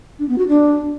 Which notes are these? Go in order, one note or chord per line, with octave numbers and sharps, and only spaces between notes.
D4
B3
F#4
D4